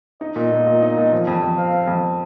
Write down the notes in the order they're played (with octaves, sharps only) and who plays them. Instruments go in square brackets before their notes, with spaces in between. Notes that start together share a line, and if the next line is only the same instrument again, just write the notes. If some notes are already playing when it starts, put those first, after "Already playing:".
[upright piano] D#4 [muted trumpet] D#5
[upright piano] A#2
A#2
A#2
D#4
A#2
F3
F2
F2
[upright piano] C4 [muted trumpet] F5
[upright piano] C4
F2